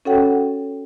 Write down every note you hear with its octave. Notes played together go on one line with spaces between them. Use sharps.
C#4 F#4 A4 C#5 F#5 G5